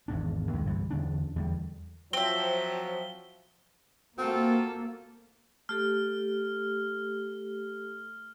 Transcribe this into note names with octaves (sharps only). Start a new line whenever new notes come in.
G#1 E2 G#2 D4
D#2 D#3 G#3
C2 G2 D3 E3
E2 D3 C#4 D4
E2 D3 G3
F3 F#3 C4 E5 G7
A#3 C4 F4 F#4 A4
A3 G4 A4 F6